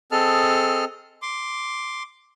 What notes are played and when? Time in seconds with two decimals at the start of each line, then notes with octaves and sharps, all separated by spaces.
0.12 C4 G#4 A4 D#5 A5 F6
1.22 C6 D6